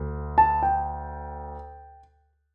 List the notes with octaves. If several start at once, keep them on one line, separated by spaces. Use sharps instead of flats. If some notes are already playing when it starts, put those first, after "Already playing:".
Already playing: D2
A5
G5